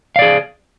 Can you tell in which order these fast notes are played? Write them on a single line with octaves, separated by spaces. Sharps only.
F5 D5 G#4